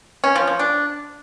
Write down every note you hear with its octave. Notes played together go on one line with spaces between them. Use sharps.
C#4
F3
F3
D4